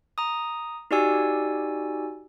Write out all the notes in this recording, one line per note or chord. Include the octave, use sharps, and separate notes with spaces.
A#5 D#6
D#4 F#4 G4 D5 G#5 E6